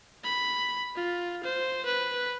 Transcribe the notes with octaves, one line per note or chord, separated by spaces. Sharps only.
B5
F4
C5
B4